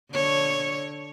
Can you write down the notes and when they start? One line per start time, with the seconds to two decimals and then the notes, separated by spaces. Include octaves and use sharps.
0.11 D3 C#5